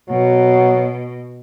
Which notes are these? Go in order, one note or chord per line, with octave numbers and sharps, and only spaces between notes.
B2 F#3